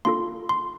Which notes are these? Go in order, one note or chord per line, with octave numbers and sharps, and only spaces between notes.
A#3 D4 F4 A4 C6
C6